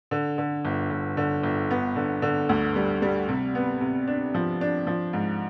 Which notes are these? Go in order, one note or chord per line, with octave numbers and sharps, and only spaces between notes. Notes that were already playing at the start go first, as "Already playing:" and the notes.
D3
D3
G1
G1
D3
G1
B3
D3
D3
D2
G3
G3
C3
B3
C3
D4
F3
D4
F3
G#2